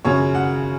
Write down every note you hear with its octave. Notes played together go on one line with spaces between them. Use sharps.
F#2 C#3 F3 C#5
F#5